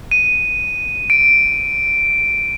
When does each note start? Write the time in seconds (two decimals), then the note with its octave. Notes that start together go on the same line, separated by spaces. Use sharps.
0.11 D#7
1.10 D7